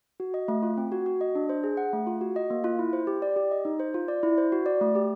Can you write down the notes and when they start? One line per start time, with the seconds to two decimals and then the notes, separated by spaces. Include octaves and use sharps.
0.20 F#4
0.34 D#5
0.48 A3
0.63 F4
0.78 C4
0.92 F#4
1.06 F#4
1.21 D#5
1.35 D4
1.49 C5
1.64 G#4
1.77 F#5
1.93 A3
2.07 F4
2.21 F#4
2.36 D#5
2.50 A#3
2.64 F4
2.79 E4
2.93 C5
3.07 G4
3.22 D5
3.36 G4
3.52 D#5
3.65 D#4
3.80 C5
3.94 F4
4.08 D5
4.23 E4
4.38 C5
4.52 F#4
4.66 D5
4.81 A3
4.95 G4